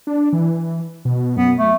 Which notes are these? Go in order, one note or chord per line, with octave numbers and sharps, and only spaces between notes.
D4
E3
B2
F#2 B3
A3